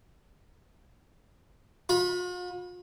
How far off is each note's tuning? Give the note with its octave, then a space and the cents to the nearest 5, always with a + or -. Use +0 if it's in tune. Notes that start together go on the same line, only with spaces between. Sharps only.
F4 +45 B5 -10